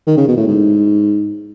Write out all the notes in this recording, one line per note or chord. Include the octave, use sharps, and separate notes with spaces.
D#3
C#3
B2
A2
G#2